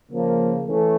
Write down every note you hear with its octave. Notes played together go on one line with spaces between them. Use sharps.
C#3 F3 A#3
E3 A3 C#4